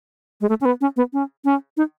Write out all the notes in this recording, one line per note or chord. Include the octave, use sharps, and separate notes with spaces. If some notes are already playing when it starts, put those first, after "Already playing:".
G#3
A3
C#4
B3
C#4
B3
C#4
C#4
D#4